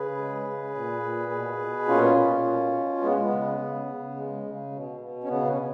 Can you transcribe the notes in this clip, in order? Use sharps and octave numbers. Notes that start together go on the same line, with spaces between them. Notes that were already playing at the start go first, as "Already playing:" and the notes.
Already playing: C#3 G#4 B4
G#3
C#3
A#2
A#2
B2
B2
A#2 C#4 F4
A#2
B2
B2
G#3 B3
B3
C#3
C#3
C#3
G#3
C#3
B2
B2
C#4
C#3 B3
C#4
C#3